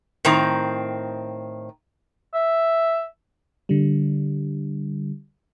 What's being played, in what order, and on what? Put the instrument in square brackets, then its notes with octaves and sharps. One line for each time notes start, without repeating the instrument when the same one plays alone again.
[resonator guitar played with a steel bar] A2 D#3 C4 A#5
[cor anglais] E5
[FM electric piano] D3 G3